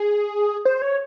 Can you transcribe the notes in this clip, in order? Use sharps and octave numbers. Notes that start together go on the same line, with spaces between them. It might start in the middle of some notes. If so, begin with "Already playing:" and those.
Already playing: G#4
C5
C#5